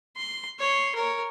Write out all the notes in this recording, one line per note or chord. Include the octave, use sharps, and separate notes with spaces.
C6
C#5 C6
A#4 C#5